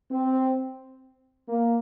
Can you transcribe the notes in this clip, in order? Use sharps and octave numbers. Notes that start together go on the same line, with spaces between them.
C4
A#3